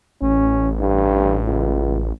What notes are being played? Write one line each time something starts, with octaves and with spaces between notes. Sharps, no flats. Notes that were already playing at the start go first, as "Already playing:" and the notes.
A1 C#4
G2
C#2